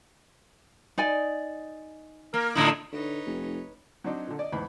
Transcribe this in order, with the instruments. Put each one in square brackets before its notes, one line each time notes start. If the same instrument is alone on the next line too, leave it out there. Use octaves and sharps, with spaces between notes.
[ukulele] D#4 D5 G#5
[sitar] A#3 [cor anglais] A#4
[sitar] A2 D3 E4 [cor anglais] D#4
[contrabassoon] D3 [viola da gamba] D#4 B4 C#5
[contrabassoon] F1
[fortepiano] F#3 C4 D4 D#4
A#2 D3
D5 D#5
E2 G#2 B5